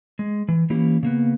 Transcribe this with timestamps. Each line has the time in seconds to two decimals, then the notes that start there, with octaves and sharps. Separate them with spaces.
0.19 G#3
0.48 E3
0.70 E3 A#3 C#4 E4 G4
1.03 C#3 A#3 B3